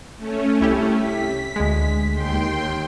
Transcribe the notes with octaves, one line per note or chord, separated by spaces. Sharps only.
A3 C#4
C2 E4 G4
B6
D2 G#3
D#2 G5 C6